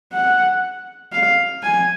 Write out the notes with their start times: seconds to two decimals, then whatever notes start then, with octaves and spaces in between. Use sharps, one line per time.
0.13 F#5
1.12 F5
1.63 G#5